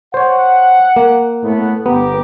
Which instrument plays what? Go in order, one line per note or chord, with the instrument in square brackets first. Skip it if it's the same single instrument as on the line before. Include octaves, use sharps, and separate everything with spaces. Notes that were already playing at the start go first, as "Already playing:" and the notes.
[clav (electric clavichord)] C5 C#5 [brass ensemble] F#5
[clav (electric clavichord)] A#3
[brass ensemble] A2 A3 B3
[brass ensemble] G1 G4 A#5 [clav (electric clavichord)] B3